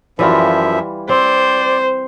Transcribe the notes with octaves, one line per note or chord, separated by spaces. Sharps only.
F#2 E3 F3 G3 F4 E5
C4 C5 D5